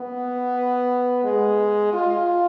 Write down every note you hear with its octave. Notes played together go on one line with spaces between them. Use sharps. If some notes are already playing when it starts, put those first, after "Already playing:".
Already playing: B3
G#3
F4